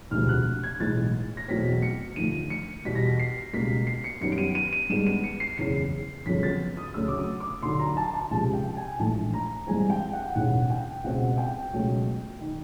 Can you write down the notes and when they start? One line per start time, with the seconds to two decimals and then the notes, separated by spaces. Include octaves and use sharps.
0.11 E1 D2 C3 F3 F6
0.29 F#6
0.63 G#6
0.80 B1 A2 E3 G#3 B3 A6
1.37 A#6
1.48 E2 B2 F#3 A3 C4 B6
1.82 C#7
2.16 D#2 D3 F3 A3 D#7
2.50 C#7
2.85 E2 B2 G3 B6
2.95 A#6
3.06 B6
3.19 C7
3.53 C#2 B2 G3 A#3 B6
3.87 C7
4.04 C#7
4.21 F#2 D#3 G3 B3 C#7
4.32 D7
4.38 D#7
4.55 D#7
4.73 D#7
4.90 G2 D#3 G#3 B3 E7
5.07 D#7
5.24 C#7
5.40 C7
5.58 F#1 E2 C#3 C7
6.26 G1 F2 C#3 F#3 B3 B6
6.43 A6
6.77 D#6
6.94 D2 C#3 F#3 A3 E6
7.08 D6
7.18 D#6
7.40 D6
7.62 D#2 D3 F#3 C6
7.79 A#5
7.97 A5
8.14 A5
8.31 C#2 C3 F3 A5
8.53 G5
8.77 G#5
8.99 A#1 G#2 E3 A3 A5
9.34 A#5
9.67 G2 E3 G#3 C4 G#5
9.90 G5
10.13 F#5
10.35 E1 D#2 C#3 E3 F#5
10.70 G5
11.04 C#2 B2 G#3 C4 F#5
11.38 G5
11.73 C#2 B2 F#3 A3
12.41 D#3